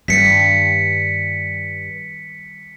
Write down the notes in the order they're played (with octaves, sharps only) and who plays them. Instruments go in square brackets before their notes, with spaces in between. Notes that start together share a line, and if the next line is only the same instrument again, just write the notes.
[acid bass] G2 [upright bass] D#3 G3 [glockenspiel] B6 C#7